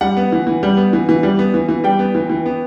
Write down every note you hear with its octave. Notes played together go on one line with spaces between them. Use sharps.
G3 F#5
B3
E3
E3
G3
B3
E3
E3
G3
B3
E3
E3
G3 G5
B3
E3
E3
B3